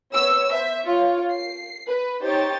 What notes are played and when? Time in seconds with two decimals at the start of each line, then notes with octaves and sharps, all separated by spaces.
0.14 B3 C#5 E6
0.52 C5 E5
0.81 F4 C#5
1.31 C7
1.88 B4
2.22 D#4 G4 C5 C#5 A6